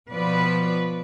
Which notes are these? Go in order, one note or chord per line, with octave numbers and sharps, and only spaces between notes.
B2 F3 B4 D5